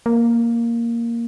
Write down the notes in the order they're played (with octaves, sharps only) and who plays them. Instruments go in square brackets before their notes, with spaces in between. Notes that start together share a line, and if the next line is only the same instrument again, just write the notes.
[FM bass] A#3